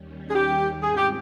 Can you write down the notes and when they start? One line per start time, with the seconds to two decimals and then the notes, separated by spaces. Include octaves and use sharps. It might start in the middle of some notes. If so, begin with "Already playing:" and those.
Already playing: D#2 D#3 G3 C#4
0.30 G#4
0.34 D#2 D#3 G3 C#4 G4
0.81 G#2 G3 C4 F4 G#4
0.97 G4